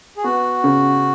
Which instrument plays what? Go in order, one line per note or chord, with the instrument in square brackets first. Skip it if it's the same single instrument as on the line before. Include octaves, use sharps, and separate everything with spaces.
[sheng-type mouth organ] G#4
[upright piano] B3 [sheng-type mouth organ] F#4
[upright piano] C#3